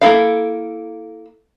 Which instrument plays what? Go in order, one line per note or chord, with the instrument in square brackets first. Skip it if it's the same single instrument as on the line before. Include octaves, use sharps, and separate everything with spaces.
[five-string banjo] A#3 E4 A4 A#4 F5